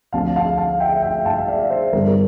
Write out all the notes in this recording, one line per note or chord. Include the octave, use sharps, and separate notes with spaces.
D2 D3 F3 C4 F5 A5
F5 A5
F5 A5
E5 G5
E5 G5
F5 A5
E5
D5 F5
C5 E5
G1 G2 D3 A#4
A#4